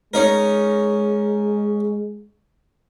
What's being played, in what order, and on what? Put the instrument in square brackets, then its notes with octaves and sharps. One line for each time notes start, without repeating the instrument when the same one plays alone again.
[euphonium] G#3 [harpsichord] C#4 D#4 A#4